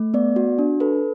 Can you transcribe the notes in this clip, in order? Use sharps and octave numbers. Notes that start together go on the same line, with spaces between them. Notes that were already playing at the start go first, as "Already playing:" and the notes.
Already playing: A3
B3 D5
F#4
D4
A4 B4